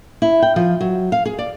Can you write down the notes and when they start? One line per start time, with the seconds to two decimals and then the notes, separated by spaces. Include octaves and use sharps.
0.22 E4
0.42 G5
0.56 F3
0.81 F#3
1.12 F5
1.26 G#4
1.39 D5